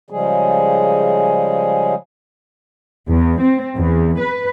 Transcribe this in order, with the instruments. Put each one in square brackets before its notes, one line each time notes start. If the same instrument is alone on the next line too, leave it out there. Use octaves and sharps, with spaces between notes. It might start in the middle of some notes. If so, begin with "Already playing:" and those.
[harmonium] C#3 F3 G3 G#3 G#4
[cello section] E2
C4
E2
B4